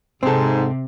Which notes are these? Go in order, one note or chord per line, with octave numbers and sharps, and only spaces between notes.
G#2 C3 C4 A4